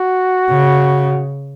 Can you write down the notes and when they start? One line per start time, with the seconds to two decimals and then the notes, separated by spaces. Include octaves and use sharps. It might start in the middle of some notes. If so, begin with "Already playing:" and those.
Already playing: F#4
0.50 C#3